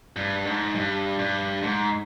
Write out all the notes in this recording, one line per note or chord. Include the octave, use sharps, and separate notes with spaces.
G2
G#2
G2
G2
G#2